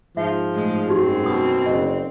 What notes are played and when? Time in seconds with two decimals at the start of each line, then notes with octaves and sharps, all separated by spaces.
0.17 G#2 F3 E5
0.54 A2 G#3
0.89 F#2 C4 D#4 F#4 G4
1.26 B2 D#6
1.66 F#1 D#5